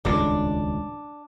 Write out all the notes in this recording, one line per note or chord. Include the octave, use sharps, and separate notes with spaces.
D#1 C#2 A2 D4